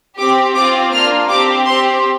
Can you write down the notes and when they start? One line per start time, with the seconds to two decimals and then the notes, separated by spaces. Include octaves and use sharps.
0.18 C4 G4 D6
0.55 C4 F4 D6
0.92 A#3 D4 F4 F6
1.29 C4 G4 D6
1.66 C4 G4 C6